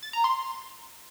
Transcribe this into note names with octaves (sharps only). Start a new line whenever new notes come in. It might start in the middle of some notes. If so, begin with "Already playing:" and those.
A6
A#5
C6